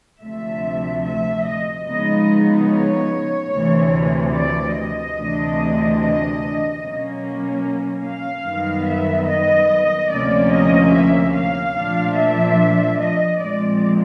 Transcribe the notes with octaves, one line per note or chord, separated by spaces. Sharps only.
D2 C3 F3 A3 E5
E5
D#5
C#3 F3 G#3 B3 D#4 D#5
C#5
D2 C3 E3 A3
D5
D#5
D2 C3 E3 A3 D4
D#5
B2 F#3 A#3 C#4
F5
F#2 D#3 G3 B3
E5
D#5
D2 C3 F3 A#3 C#4 D5
D#5
E5
F5
A#2 F3 A3 D4
E5
D#5
A#2 F3 G#3 C4 D5